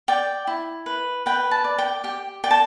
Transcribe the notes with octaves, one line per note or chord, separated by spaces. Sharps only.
D5 G5
E4
B4
B4 G5
A5
D5
G5
G4 G5
D5 G5
A5